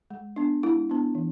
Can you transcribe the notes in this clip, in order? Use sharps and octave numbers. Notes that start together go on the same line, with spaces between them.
G#3
B3 D4
G#3 E4
B3 D4
E3